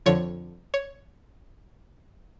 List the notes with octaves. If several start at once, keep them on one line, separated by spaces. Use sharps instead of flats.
F2 D3 F3 C#5
C#5